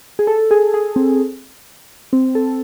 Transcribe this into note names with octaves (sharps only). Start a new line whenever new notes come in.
G#4
A4
G#4
G#4
C4
C4
A4